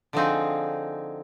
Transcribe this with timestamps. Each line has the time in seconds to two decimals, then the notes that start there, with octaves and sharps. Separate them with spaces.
0.13 D3 F3 C4 D#4 G#4